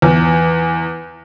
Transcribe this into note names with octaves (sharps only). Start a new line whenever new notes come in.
E2